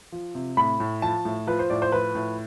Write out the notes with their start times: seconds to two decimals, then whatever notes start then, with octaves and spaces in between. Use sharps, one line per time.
0.12 F3
0.35 C3
0.57 A2 B5
0.80 A2
1.02 F3 A5
1.25 A2
1.47 F3 B4
1.59 C5
1.70 A2 D5
1.82 C5
1.92 F3 B4
2.15 A2